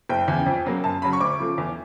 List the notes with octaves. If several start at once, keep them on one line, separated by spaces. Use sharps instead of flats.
F#1 G5
E2 C#3
F2
C#3 F#3 A#3
F#2 A5
C#3 F#3 B5
C#6
D2 D6
C#3 F3 A3
E2